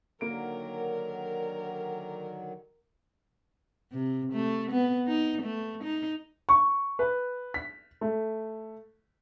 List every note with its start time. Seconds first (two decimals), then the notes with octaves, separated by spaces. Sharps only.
0.21 D3 D#3 F#3 A#3 A#4 D7
3.92 C3
4.33 A3
4.71 B3
5.08 D#4
5.42 A3
5.84 D#4
6.49 C#6
6.99 B4
7.54 B6
8.01 A3